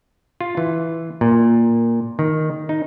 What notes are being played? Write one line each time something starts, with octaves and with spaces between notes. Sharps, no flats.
F4
E3
A#2
D#3
D#4